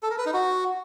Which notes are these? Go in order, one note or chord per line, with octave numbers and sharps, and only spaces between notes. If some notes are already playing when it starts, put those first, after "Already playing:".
A4
A#4
B4
D#4
F#4